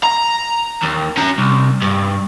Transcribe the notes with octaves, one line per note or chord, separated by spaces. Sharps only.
A#5
D#2
C#4 A#5
C2
G2